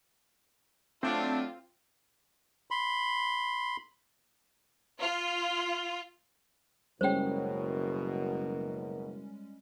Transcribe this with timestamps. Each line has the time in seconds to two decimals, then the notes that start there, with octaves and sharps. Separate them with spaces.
1.03 F#3 A3 C4 D4 F4
2.71 B5 C6
4.99 F4
7.01 F#1 B2 G3 G#3 C#4 A#4 C5 G5